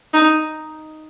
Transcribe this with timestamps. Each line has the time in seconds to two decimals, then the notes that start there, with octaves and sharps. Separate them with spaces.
0.14 D#4